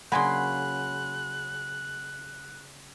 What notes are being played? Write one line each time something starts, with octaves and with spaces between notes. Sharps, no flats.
C#3 F#3 A#3 F#5 G#5 B5 C6 F#6